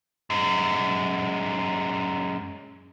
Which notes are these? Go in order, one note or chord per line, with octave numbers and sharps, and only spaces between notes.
F#2 G#3